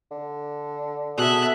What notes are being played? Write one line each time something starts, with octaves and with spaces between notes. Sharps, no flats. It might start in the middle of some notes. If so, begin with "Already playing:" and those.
D3
B2 G#4 A4 E5 F#6